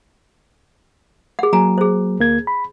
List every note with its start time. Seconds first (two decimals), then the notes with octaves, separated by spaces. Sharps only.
1.39 G#4 F#5
1.53 F#3 A#3 G#5 A#5
1.78 G#4 C5
2.20 D2 A#3 G#6
2.47 B5